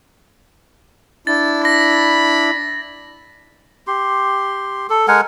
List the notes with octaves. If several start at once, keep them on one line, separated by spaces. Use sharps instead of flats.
D4 E4 A6
B5 A6 A#6
G4 C6
A4
G#3 A#4 F#5 G#5